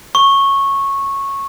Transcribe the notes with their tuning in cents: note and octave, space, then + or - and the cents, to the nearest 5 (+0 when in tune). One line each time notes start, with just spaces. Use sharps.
C#6 -10